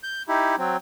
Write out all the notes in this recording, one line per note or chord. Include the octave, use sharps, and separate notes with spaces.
G6
D#4 E4 G4
F#3 C4